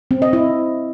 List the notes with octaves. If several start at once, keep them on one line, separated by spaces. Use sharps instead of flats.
C4
D#5
E4